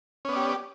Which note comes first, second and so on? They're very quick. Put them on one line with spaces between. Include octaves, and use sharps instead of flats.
C#4 B3 D5 G4